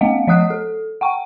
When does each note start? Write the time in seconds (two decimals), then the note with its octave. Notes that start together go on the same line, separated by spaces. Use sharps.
0.01 A3 B3 D#5 F5 F#5
0.27 F3 D#5 F#5 D#6 F#6 C7
0.50 A4
1.01 F#5 G5 C#6